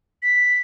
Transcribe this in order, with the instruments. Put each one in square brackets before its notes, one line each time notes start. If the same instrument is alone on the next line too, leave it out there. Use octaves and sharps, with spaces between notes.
[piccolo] B6